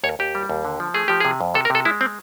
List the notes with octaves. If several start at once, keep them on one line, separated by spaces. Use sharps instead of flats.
D#2 C#5
D#2 G4
G3
D#2
D3
F3
A3 G#4
F3 G4
C3 G#4
F2
C3 A4
A#4
C3 A4
G#3 E4
C4